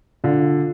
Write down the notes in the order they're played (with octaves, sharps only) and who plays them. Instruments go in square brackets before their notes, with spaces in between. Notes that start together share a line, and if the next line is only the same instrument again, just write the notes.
[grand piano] D3 [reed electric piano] D4 F4